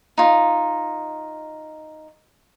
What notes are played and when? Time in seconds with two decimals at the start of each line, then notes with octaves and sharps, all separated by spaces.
0.18 D#4 F4